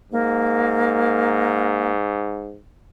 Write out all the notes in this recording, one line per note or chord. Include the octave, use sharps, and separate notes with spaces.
G#2 A#3